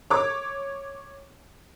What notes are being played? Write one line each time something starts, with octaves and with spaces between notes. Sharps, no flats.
C#5 D6